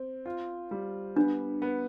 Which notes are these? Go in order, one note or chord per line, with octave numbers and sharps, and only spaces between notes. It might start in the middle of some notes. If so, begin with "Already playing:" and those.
Already playing: C4
F4
G3
B3 D4
B3